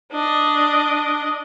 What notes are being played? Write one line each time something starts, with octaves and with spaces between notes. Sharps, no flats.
D4 D#5